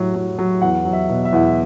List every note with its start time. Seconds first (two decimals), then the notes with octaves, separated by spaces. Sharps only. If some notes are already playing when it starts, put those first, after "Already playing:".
Already playing: A2 F#3
0.15 F#3
0.39 F#3
0.61 E2 F#5
0.85 F#3
0.93 E5
1.09 B2
1.25 E5
1.33 E2 F#5
1.46 E5